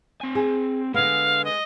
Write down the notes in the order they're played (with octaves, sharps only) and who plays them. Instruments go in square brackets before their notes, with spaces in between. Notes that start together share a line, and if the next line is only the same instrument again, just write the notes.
[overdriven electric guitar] C4 G#5
[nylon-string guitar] G#4
[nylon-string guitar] D3 B3 [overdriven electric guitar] G#3 [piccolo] F5
[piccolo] D#5